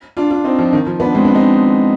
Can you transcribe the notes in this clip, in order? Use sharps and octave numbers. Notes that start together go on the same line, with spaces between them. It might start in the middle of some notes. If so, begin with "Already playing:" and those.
D4 F4
D4 F4
C4 D#4
F3
D#3
F3
B3 D4
G#3 C4
B3 D4
C4 D#4